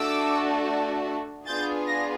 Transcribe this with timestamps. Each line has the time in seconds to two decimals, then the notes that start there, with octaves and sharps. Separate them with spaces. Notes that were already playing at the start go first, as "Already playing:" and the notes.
Already playing: A3 D4 F#4 A4 D6 E6
1.46 B3 D4 F4 G#4 G6 A6
1.87 A#6